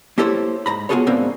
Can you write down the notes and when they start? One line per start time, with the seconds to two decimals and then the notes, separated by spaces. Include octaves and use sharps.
0.18 A#3 E4 G4 A4 C5 C#5
0.66 G#2 A#5 B5
0.89 B3 F4 F#4 G#4 A4 C#5
1.07 D2 G#2 B2 D3 A#3 C4